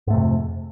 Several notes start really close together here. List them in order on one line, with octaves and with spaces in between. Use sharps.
G#2 A3 C3 F2